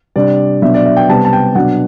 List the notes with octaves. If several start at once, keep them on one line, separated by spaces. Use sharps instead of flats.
C3 G3 D4 D5
B2 F#3 B3 D4 E5
D5
E5
G5
C3 G3 B3 A5
A5
G5
B2 F#3 B3 D4 F#5